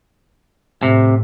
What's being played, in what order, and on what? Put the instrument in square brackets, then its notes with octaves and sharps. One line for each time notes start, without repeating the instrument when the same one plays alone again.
[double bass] A2 [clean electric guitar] C3